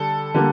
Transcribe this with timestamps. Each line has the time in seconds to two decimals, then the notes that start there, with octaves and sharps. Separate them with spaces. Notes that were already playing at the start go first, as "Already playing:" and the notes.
Already playing: D3 G3 A4
0.34 D3 G3 A#3